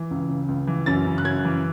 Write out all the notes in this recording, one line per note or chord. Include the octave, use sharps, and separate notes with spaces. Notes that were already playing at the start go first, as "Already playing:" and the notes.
Already playing: E3
C#2
C#3
C#2
E3
F#2 A6
C#3
F#6
F#2 G#6
E3